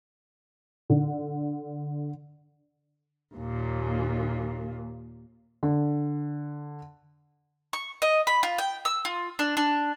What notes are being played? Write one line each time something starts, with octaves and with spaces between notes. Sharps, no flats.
D3
D#2 A#2
D3
C#6
D#5
B5
F4
G5
E6
F4
D4
D4